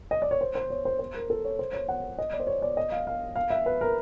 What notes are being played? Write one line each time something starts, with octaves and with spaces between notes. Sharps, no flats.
D#5
D5
C#5
C5
C5
C#5
C5
C5
A#4
A4
C#5
C5
C#5
F#5
D#5
D5
C5
C#5
D5
D#5
F5
F5
F5
E5
B4
A#4